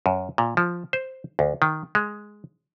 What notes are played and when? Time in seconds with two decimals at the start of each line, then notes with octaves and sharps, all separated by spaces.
0.06 F#2
0.38 A#2
0.57 F3
0.93 C5
1.39 D2
1.62 D#3
1.95 G#3